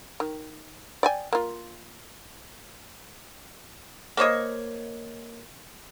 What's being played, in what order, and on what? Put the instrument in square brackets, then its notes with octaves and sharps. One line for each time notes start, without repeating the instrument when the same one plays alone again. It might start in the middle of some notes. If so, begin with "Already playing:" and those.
[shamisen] D#3
D5 G5 G#5
A#3 F4
[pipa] A#3 C5 C#5 D#5